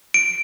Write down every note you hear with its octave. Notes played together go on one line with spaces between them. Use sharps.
D7